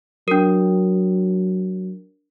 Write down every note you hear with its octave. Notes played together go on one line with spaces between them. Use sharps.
F#3 D4 A#4